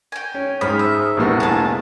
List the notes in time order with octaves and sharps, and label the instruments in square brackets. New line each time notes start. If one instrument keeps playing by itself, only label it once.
[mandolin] G5 G#5
[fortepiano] C#4
[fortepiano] G#2 C5 [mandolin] B5 [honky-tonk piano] D#6 F6
[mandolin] E5
[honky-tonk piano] F1 A#1 A2 [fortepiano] G3 A#3 B3
[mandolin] G#4 A5